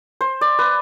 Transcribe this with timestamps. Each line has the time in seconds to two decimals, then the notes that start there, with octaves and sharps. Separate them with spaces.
0.21 C5
0.41 D5
0.59 B4